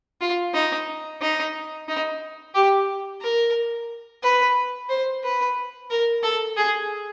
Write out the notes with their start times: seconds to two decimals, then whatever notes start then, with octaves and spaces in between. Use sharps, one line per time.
0.21 F4
0.54 D#4
1.21 D#4
1.88 D#4
2.55 G4
3.21 A#4
4.23 B4
4.89 C5
5.24 B4
5.90 A#4
6.23 A4
6.57 G#4